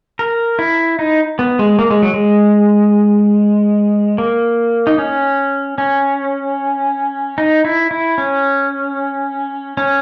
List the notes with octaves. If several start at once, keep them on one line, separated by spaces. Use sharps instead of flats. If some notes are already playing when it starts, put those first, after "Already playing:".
A#4
E4
D#4
B3
G#3
A#3
G#3
F#3
G#3
A#3
D#4
C#4
C#4
D#4
E4
E4
C#4
C#4